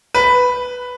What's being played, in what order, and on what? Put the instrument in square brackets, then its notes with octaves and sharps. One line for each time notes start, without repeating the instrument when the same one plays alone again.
[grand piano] B4